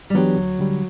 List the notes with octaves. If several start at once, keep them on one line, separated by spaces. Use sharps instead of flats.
G3
E3 F#3 B3 D4 G4
D2
D3 G3